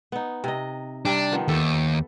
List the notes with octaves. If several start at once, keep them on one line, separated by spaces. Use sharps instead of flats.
B3 D#4
C3 D#5
C3 G3 D4 G4
D#3 F3 B3
D#2 A4 E5